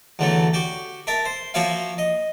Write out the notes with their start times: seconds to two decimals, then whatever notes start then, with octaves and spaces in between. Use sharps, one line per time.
0.19 E2 D3 F#3 A3
0.53 F#4 G4
1.07 A#4 E5 A5
1.25 C5
1.54 F3 A#3 F#4 C#5 E5 F5
1.98 D#5